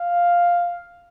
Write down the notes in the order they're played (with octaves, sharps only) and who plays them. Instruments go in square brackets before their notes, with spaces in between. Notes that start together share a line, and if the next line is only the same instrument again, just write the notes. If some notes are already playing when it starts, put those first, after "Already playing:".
Already playing: [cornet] F5